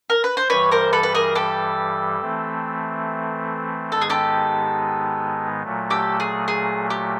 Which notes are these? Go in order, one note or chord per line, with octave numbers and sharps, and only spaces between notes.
A#4
B4
C5
G2 E3 G3 B4 C#5
A#4 C5
A4 B4
B4
G#4 A#4
G4 A4
E3 A3 C4
G#2 D#3 G#3 B3 D#4 A4
G#4
G4 A4
A#2 F#3 A3
G4 A4
G#4
G#4
G4